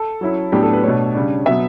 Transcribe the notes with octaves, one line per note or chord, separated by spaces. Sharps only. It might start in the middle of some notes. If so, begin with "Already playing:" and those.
Already playing: A4
F#3 C#4 E4
A2 F#3 B3 D4 G4
A4
B4
B2 A3 D4 C#5
C#3 G3 D4
B2 F#3 B3 E5